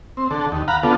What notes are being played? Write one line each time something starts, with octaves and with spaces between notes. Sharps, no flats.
C4
D3 A4
D#2
F5 F#5 A#5 B5
D3 B3 F4 A4